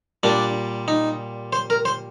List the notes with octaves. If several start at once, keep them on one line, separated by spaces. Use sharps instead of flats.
A#2 G3 D4
D#4
C5
A#4
C5